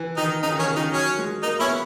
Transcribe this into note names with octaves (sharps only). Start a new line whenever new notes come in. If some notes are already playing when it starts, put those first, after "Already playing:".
Already playing: E3
D#3 D#4
C#3 D#4
D#3
C#3 C#4
D#3 D#4
F#3 C#4
G#3
A#3 D#4
B3 C#4 E4